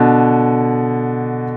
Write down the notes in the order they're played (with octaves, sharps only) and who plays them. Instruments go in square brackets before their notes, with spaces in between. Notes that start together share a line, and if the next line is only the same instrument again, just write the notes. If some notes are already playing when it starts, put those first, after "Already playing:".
Already playing: [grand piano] B2 D3